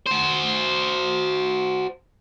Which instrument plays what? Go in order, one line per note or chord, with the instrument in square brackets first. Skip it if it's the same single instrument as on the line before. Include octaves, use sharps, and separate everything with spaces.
[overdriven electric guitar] F#4 C5